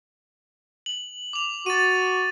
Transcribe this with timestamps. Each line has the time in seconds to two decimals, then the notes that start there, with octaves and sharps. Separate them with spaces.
0.86 F#7
1.33 D6 F7
1.66 F#4 A6 D#7